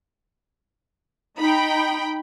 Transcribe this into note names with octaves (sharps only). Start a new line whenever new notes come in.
D#4 G5 B5